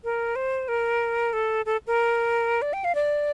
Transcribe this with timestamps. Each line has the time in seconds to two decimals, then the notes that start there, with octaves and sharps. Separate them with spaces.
0.04 A#4
0.36 C5
0.68 A#4
1.33 A4
1.66 A4
1.87 A#4
2.62 D5
2.73 G5
2.84 F5
2.95 D5